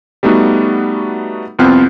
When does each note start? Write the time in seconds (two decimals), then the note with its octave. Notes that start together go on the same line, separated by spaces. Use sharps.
0.23 G3 A3 B3 D#4 F#4
1.59 C2 F2 B3 C4 F4 F6